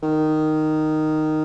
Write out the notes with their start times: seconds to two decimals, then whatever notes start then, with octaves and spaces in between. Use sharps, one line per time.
0.02 D#3